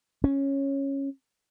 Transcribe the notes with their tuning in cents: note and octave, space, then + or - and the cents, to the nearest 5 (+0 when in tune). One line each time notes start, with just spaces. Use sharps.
C#4 -10